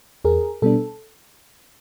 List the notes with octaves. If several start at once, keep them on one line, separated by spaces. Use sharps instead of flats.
E2 G#4 A#4
B2 G3 B3 D4 A4